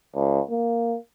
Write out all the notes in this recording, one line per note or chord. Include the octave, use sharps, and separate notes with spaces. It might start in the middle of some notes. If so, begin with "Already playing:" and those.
C#2
A#3